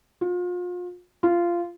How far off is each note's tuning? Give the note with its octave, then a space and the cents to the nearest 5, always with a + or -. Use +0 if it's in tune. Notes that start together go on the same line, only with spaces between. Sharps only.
F4 +35
F4 -15